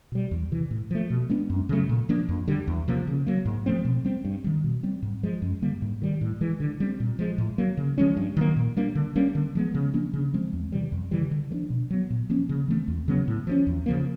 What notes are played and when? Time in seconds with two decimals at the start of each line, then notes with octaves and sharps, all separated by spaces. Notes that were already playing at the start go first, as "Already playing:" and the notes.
0.12 B2 G3
0.31 E2
0.52 C3 E3
0.71 A2
0.91 F3 A3
1.10 B2
1.29 G#3 B3 D4
1.50 F#2
1.69 C#3 F#3 A3
1.89 A#2
2.09 F3 A#3 D4
2.29 F2
2.48 D3 G3
2.67 E2
2.88 C3 F3 A#3
3.07 C#3
3.27 F#3 A#3
3.45 G#2
3.66 F3 A3 C4
3.85 B2
4.05 G3 C4
4.24 G2
4.44 D#3 G3
4.64 B2
4.83 G3 C4
5.02 G#2
5.23 F3 G#3
5.42 F#2
5.62 D3 G3 A#3
5.82 G#2
6.02 D#3 G3
6.21 A2
6.41 E3 G#3
6.60 D3
6.80 G3 C4
7.00 A#2
7.19 F3 G#3
7.38 A2
7.58 F#3 A#3
7.77 C#3
7.98 F3 G#3 C#4
8.17 G2
8.37 D#3 F#3 A#3
8.56 A#2
8.77 G3 A#3 D4
8.95 D3
9.16 G3 A#3 C#4
9.35 D3
9.55 F3 G#3 B3
9.74 C#3
9.93 F3 A#3 D4
10.13 C#3
10.33 F3 G#3 C4
10.53 E2
10.72 C3 E3 G3
10.92 F2
11.11 C#3 E3 G3
11.31 D3
11.50 F3 A3
11.54 D4
11.70 B2
11.90 F#3 B3
12.10 A#2
12.30 F3 A#3 C#4
12.49 C#3
12.68 E3 A3 C4
12.88 E2
13.08 C#3 F#3 B3
13.28 A2
13.47 F3 G#3 C#4
13.67 E2
13.86 C#3 F3 A#3